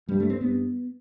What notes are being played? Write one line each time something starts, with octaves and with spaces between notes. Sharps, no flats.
G2 G3
A3
C4
G2 B3